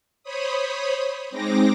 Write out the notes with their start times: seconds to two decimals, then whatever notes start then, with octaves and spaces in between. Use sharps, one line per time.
0.23 C5 C#5 B5 D#6
1.31 G#3 C4 D#4 D6 A#6